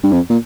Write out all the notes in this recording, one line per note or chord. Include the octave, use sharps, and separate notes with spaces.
G2
F2
A#2